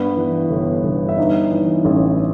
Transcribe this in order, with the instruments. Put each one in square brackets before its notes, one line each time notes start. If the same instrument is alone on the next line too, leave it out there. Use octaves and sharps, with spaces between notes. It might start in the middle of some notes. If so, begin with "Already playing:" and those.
Already playing: [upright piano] G2 B3 B4
E3
G1
G1
E5
G2 D#4 D#5
E3
A1